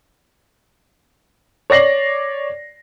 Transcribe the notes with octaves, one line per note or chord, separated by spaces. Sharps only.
C#5 D5 A#6 C7 F#7